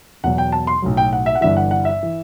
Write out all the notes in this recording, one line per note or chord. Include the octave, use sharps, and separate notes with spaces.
E2 B2 F#3 F#5
G5
A5
C6
B1 A2 F#3
G5
F#5
E5
F#5
G1 G2 E3 E5
F#5
F#5
E5
E3